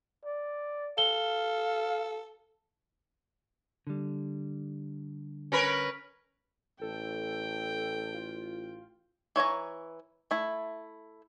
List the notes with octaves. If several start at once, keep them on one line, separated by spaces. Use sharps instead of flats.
D5
A4 F5 G7
D3 G3
C#4 A#4 B4
A1 A4 G5
F4
E3 C#5 G#5 A#5
A3 E4